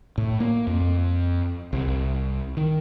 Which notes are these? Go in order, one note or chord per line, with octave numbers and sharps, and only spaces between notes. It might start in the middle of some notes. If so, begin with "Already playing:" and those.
A2
A#3
F2
C2
D#3